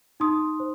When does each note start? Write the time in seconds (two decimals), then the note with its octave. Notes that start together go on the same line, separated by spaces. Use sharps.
0.20 D#4 C6 D#6
0.60 C5